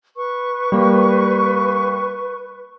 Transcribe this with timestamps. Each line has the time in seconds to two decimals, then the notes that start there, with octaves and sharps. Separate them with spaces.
0.16 B4 C#6
0.72 G3 A#3 A#4